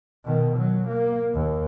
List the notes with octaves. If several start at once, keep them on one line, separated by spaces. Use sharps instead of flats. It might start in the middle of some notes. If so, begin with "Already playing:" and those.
B2 D#3
F#3
A#3
D#2